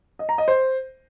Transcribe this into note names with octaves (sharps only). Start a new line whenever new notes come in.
D#5
A#5
D#5
C5